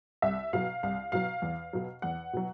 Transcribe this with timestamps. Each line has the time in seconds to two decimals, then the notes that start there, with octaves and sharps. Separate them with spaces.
0.22 C2 E5
0.53 B2 F#3 F5
0.83 C2 F5
1.12 B2 F#3 F5
1.42 E2
1.73 B2 F#3
2.02 E2 F#5
2.33 B2 F#3